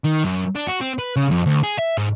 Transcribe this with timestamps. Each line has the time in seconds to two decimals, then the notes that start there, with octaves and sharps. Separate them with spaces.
0.05 D#3
0.24 F#2
0.56 D4
0.68 F#4
0.81 C4
0.99 B4
1.16 C#3
1.31 F2
1.46 D2
1.63 G#4
1.79 E5
1.97 G#2